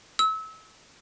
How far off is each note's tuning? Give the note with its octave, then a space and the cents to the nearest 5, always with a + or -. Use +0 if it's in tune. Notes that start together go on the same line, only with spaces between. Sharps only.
E6 -30